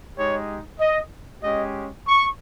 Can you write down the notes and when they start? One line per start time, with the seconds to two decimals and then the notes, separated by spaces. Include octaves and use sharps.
0.16 G#3 D#4 G4 C#5
0.80 D#5
1.44 G#3 C#4 G4 D#5
2.08 C#6